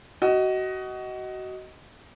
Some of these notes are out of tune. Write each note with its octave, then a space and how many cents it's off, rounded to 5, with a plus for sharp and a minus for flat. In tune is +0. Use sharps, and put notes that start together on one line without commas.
F#4 +25 D#5 +10